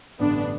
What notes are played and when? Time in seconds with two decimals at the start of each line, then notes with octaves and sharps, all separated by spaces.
0.19 A1 G2 D3 B3 D4